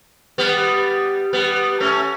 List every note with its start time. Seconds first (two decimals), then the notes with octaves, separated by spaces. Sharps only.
0.38 G3 B3
1.33 G3 B3
1.80 A3 C#4